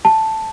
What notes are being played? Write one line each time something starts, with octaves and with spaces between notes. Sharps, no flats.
A5